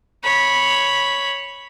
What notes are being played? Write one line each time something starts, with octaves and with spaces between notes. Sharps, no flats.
C#5 B5